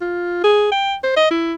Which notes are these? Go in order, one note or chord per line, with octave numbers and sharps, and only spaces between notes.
F4
G#4
G5
C5
D#5
E4